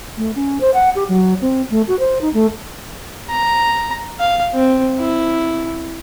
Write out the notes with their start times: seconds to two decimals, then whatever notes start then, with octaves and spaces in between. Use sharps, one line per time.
0.17 A3
0.35 C#4
0.61 C5
0.74 F#5
0.95 G4
1.09 F#3
1.41 C4
1.70 A3
1.88 F#4
1.99 C5
2.21 D#4
2.34 A3
3.30 A#5
4.19 F5
4.54 C4
4.99 E4